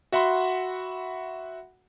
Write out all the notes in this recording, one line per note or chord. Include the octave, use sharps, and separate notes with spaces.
F#4 E5 F#5 B5 C6